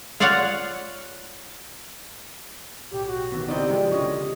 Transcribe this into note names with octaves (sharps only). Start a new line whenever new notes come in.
F4 C#5 D5 F5 F#5
B1 A2 G4
F#4
D#3 B3
C#3 C4 D#4 E4 G4 A4 D5 D#5
F3 G#3 F#4 G5 C#7
C2 D3 D#3 C#4 F4 D#5